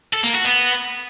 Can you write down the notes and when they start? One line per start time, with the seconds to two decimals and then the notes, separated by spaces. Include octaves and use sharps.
0.14 A4
0.24 A#3
0.34 F#4
0.44 B3